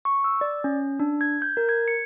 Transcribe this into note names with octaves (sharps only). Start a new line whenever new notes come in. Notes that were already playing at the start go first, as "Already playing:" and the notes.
C#6
E6
D5
C#4
D4
G#6
G6
A#4
G#6
C#7